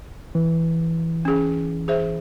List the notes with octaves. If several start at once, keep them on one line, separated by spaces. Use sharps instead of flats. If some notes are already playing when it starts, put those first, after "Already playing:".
E3
C#4 G#4
G#4 C5 E5